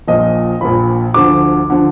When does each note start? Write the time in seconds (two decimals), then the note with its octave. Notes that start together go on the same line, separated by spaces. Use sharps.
0.07 A#1 A#2 F3 D#5
0.61 A#1 A#2 F3 B5
1.14 D2 D3 F3 D6
1.70 D3 F3